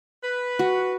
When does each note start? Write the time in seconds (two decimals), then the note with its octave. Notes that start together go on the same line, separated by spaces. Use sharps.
0.24 B4
0.59 F#4